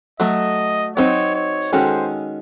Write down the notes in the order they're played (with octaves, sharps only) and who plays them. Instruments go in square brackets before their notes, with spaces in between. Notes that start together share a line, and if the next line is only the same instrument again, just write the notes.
[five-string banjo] F#3 A3 [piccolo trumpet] D#5
[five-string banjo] F#3 C4 D#4 [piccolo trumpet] C#5
[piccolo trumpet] C#5
[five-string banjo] D#3 G#3 C#4 F#4 A4 [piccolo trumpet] C5